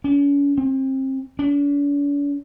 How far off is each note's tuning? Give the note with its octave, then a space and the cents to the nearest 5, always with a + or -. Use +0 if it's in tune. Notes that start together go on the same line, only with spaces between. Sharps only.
C#4 +40
C4 +30
D4 -45